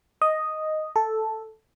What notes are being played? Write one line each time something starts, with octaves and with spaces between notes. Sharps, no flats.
D#5
A4